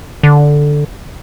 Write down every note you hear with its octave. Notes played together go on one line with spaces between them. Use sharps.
D3